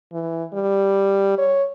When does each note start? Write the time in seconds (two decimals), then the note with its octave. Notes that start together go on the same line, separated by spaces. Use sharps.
0.13 E3
0.53 G3
1.38 C#5